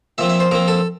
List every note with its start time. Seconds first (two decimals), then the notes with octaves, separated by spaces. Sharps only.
0.18 A#2 F3 C4 E5
0.29 E5
0.40 C5
0.51 A#2 F3 C4 A#4
0.68 A4